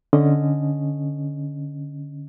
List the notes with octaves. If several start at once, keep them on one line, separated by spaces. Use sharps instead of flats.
D3 C#4 D#5